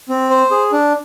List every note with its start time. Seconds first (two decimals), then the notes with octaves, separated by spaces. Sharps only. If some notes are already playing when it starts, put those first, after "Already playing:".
0.09 C4
0.30 C5
0.51 G#4
0.72 D4